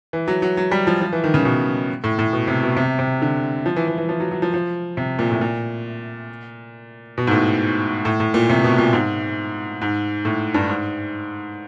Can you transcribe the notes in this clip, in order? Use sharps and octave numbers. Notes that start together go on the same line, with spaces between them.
E3
F#3
F#3
F#3
G3
F3
F3
E3
D#3
C#3
B2
A2
A2
B2
C3
B2
C3
C3
D3
F3
E3
E3
E3
F3
F#3
F#3
F3
F3
C3
A#2
A2
A#2
B2
G#2
A2
A2
A2
A#2
C3
B2
A#2
G#2
G#2
A2
G2
G#2